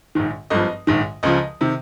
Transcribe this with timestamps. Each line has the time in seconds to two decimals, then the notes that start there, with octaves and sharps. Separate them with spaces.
0.15 A#1 G#2 D#3
0.50 G#1 G2 F3 D#5
0.87 A#1 G#2 D#3
1.23 C#2 C#3 F3 D#5
1.61 C3 D#3